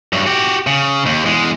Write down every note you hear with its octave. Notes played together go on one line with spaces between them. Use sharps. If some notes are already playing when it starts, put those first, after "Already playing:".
G2 F#3
F#4 G4
C#3
D#2
E2 G#3